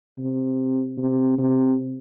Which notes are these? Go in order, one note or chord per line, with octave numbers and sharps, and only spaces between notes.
C3
C3
C3